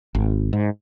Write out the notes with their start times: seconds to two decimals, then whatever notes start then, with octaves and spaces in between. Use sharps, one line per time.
0.15 G#1
0.53 G#2